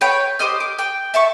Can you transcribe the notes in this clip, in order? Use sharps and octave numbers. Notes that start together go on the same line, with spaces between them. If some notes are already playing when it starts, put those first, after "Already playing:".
B4 C#5 G5
G4 C5 D#5 F6
D6
G5
E5 A5 C#6